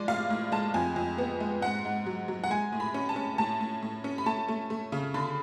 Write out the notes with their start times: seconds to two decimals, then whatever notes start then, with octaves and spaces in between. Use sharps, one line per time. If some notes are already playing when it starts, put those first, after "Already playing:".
Already playing: F3 G#3 D5
0.08 A2 F5
0.30 A2
0.52 G#3 A5
0.74 F2 G#5
0.96 F2
1.18 B3
1.40 G#3
1.62 G#2 F#5
1.85 G#2
2.06 F#3
2.28 F#3
2.44 F#5
2.50 G#3 G#5
2.72 A2
2.80 B5
2.94 C#4
3.09 A5
3.16 C#4
3.38 A2 A5
3.61 A2
3.82 A2
4.04 C#4
4.18 B5
4.26 A3 A5
4.48 A3
4.70 A3
4.92 C#3
5.14 D3 B5